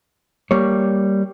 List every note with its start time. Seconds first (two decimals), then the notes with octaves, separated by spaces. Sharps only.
0.51 G3 A#3 C#5